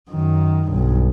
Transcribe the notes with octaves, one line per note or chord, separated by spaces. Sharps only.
F#2 D#3
B1 G2